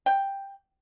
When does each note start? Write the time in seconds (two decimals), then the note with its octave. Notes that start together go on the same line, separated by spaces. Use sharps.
0.06 G5